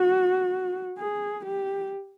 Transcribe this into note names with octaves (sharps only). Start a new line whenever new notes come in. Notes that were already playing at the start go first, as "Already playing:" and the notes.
Already playing: F#4
G#4
G4